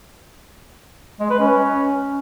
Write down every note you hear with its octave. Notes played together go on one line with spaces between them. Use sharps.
G#3
B4
C#4